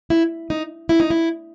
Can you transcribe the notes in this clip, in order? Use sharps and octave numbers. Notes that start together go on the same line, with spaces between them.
E4
D#4
E4
D#4
E4